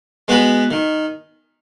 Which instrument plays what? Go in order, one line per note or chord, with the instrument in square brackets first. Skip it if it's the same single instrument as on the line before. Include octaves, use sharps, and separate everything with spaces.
[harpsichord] G#3 B3 F#4 B4
D#3